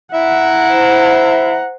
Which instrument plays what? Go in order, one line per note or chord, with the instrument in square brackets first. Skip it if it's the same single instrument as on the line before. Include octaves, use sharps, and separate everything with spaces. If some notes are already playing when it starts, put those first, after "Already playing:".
[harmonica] E4 E5 [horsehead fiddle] F#5 A#5
[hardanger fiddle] C5